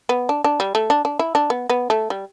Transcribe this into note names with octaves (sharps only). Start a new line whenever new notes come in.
B3
D4
D4
G3
A3
D4
D4
E4
D4
B3
B3
A3
G3